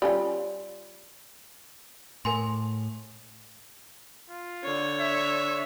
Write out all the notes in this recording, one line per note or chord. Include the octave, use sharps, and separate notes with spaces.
G3 C#4 F4
A2 A#4 G#5 C6
F4
D3 C#5
E5